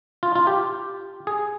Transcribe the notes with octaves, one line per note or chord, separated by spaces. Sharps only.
F4
F4
G4
G#4